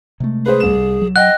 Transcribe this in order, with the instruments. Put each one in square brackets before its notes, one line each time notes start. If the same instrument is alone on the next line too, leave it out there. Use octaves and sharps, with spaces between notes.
[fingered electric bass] C3 G#3 A3
[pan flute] G#4 [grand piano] B4 C5
[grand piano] C2 E7
[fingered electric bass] F#3
[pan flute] D#5 [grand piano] F#5 G5 [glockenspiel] F#6